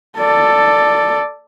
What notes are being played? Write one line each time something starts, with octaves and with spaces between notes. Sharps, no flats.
A4 D5